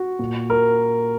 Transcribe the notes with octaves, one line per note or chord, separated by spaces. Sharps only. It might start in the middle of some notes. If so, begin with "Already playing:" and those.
Already playing: F#4
A#2
A#4